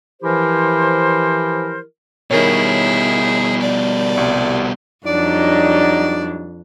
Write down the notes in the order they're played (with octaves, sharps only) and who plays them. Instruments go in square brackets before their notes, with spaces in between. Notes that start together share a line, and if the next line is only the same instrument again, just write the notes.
[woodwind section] E3 F3 E4 G4 A#4 C5
[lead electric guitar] B2 G3 [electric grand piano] D#3 A#4 C#5 [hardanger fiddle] E4 G#4
[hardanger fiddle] D5
[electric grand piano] C2
[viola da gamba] F2 [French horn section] F#3 G3 D#4 [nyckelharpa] D4 [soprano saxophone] D5